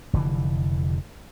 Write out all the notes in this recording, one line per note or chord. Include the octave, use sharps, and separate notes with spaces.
F1 D3 E3